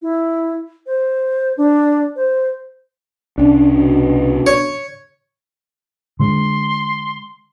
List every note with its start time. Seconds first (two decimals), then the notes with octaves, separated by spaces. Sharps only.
0.02 E4
0.86 C5
1.57 D4
2.16 C5
3.38 C2 C#4 D4
3.72 B2
4.47 C#5
6.20 D3 G#3 C6